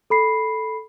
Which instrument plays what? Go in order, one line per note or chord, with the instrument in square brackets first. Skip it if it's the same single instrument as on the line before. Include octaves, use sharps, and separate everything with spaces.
[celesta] A4 B5 C7